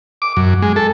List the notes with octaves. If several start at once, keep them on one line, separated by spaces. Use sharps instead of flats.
D6
F#2
G#3
A4